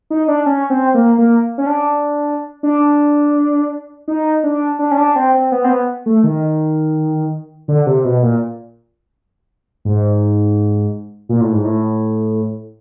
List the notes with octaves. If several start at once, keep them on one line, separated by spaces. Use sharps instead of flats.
D#4
D4
C#4
C4
A#3
A#3
C#4
D4
D4
D#4
D4
D4
C#4
D4
C4
C4
B3
C4
B3
A3
D#3
D3
C3
B2
A#2
G#2
A#2
A2
G#2
A2